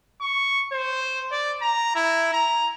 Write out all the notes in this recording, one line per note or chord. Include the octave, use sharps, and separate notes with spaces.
C#6
C5
D5
A#5
E4
A#5